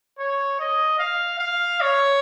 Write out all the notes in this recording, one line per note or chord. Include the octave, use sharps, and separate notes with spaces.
C#5
D#5
F5
F5
C#5